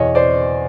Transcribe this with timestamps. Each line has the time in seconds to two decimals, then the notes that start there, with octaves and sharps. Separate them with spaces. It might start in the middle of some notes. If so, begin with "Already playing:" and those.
Already playing: E2 B2 C#5 D#5
0.15 C5 D5